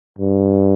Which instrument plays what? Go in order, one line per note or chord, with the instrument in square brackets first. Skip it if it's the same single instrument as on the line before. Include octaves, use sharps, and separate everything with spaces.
[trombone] G2